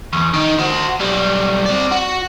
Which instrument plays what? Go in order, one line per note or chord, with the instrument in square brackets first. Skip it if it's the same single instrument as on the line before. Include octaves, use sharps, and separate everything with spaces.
[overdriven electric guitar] E2
D#3 D#4
F#4 C5
B1 G3
C4 D5
F#4